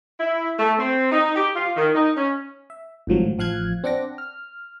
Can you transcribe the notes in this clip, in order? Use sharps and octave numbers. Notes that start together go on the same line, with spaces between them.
E4
A3
C4
D#4
G4
F4
D#3
D#4
C#4
E5
G#1 A2 F3 F#3
A1 F3 F5 F#6 G#6
C4 D4 F#5 D6 A#6
F6